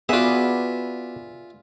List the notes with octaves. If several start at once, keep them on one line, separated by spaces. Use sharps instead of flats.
B3 F4 F#4 G#4 B4 D5 E5